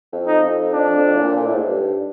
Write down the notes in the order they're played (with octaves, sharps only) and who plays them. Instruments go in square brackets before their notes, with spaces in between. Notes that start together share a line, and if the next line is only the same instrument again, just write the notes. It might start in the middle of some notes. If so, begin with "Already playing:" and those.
[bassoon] F2
[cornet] D#4
[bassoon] F2
[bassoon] F2 [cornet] D4
[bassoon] F2
A2
A#2
A#2
A2
G#2
G2